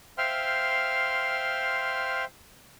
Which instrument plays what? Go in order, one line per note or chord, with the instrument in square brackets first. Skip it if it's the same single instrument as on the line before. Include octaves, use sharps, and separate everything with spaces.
[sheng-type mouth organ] C5 E5 F5 G5 C6 F6